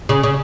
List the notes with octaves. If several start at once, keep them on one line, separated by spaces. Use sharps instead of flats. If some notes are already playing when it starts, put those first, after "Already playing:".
C#3
C#3